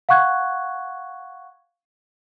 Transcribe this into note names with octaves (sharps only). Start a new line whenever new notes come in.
F5 F#5 C#6 F#6 G#6